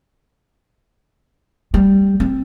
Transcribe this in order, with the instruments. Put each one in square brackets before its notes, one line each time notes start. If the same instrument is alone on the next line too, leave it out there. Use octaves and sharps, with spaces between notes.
[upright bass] G3
C4